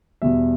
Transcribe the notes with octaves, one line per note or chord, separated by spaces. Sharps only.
E2 B2 G3 E5